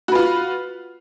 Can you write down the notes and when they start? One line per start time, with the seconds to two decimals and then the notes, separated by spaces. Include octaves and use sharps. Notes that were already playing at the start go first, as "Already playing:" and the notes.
0.08 F#4
0.12 B4
0.15 F4